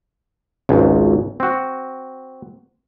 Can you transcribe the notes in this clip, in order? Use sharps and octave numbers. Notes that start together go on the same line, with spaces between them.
G#1 C#2
C4 F#4